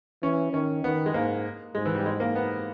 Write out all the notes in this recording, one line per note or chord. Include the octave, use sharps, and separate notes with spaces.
E3 C#4
D#3 C#4
D#3 B3
G#3
G#2 A#3
G#2 G#3
E3
G3
G#3
A#3
B3